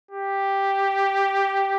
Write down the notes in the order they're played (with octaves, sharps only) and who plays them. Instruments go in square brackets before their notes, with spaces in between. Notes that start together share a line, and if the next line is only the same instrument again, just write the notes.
[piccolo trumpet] G4